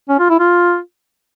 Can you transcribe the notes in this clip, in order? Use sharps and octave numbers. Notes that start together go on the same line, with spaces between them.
C#4
F4
E4
F4